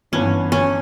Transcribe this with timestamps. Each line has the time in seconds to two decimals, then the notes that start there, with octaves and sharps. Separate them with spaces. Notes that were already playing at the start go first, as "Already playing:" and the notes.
0.12 G1 G2 E3 B3 C#4
0.52 C#4